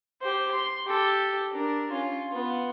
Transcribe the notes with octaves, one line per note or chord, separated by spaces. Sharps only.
G4 C5
C6
G4 A4
D4 A#4
C#4 F4
B3 F4